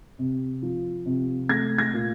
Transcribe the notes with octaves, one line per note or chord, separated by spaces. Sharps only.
C3
F3
C3
A3 G#6 A#6
G#6 A#6
A#2